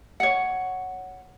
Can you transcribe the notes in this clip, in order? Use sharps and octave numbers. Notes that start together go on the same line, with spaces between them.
C#5 F#5